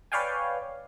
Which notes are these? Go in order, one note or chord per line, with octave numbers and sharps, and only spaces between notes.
B4 C#5 D5 F5 G5 G#5